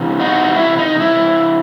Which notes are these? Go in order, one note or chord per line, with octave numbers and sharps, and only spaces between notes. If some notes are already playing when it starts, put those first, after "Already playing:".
Already playing: C3 E3
D#4 F#4
E4
D#4
E4